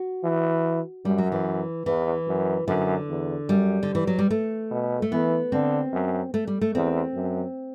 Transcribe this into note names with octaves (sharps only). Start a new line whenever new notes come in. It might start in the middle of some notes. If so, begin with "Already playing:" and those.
Already playing: F#4
E3
F#2 G3
F#3
E3
E2 E3
F#2
F#2 D3
E2
F#2 G3
D3
E3
F#3
G3
A3
B2
A3
E3 B3
D3 C4
F#2
A3
G3
A3
E2 C4
F#2